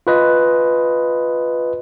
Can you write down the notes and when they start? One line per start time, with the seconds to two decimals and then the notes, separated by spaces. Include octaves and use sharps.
0.07 F4 B4 D#5